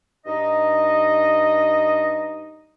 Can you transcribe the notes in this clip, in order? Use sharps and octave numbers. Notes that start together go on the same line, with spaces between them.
G2 D#4 D#5